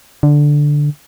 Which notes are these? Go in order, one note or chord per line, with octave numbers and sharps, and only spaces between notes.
D3